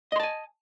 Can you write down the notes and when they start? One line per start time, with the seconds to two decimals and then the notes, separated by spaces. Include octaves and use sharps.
0.12 D#5
0.16 C6
0.20 A5
0.23 G#5